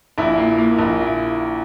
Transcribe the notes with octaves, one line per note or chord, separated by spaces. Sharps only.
A#1 E4
A#3
A#3
A#1
E4